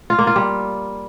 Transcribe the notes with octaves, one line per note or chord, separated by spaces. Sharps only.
F4
A#3
F4
G3